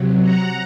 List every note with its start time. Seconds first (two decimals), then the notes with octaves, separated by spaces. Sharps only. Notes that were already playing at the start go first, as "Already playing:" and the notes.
Already playing: C3 F#3
0.23 F#5 A#5